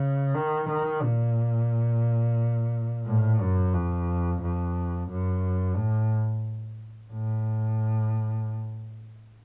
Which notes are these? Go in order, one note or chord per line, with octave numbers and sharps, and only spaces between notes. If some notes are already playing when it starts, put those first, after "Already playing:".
Already playing: C#3
D#3
D#3
A#2
A2
F#2
F2
F2
F#2
A2
A2